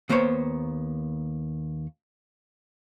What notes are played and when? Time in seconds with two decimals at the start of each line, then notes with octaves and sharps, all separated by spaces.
0.09 D#2 A#3 B3 C5 C#5